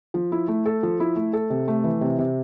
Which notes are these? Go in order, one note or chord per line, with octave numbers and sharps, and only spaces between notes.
F3
E4
A3
A4
F3
E4
A3
A4
C3
A3
E3
C3
C3